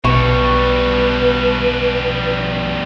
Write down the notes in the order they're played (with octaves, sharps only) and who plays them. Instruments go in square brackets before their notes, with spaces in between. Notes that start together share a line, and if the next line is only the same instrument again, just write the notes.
[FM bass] B1 [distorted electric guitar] B2 G3 [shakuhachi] B4 [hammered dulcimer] C#6